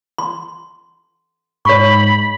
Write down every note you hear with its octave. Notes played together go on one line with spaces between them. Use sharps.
C6
G#2 C#5 B5 C#6